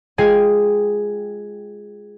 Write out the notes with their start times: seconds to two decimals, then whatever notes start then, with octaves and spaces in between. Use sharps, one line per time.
0.18 G#3 F4 G5 G#5 C7